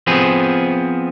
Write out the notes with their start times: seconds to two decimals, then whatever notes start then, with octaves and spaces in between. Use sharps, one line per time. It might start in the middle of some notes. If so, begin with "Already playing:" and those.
0.07 F3 B3 C4 G#4